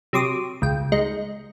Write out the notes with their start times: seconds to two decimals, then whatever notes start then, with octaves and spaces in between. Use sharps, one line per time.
0.13 C3 F#3 C6 D6 D#6
0.62 C#2 G5
0.92 G#3 D#4 C#7